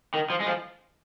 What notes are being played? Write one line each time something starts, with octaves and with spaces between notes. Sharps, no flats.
D#3
F3
G#3
F3